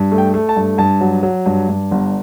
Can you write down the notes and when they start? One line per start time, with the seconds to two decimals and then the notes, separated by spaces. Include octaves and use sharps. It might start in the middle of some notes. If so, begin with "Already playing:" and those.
Already playing: G2
0.12 A3
0.18 G5
0.34 A3
0.49 A5
0.56 G2
0.78 G2 A5
1.01 F#3
1.23 F#3
1.46 G2
1.69 G2
1.91 G1